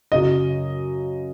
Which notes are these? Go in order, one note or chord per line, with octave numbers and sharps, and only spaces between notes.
F#2 C#3 F#3 D#5